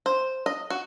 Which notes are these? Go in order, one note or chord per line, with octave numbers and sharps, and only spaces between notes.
C5
D#5
F#4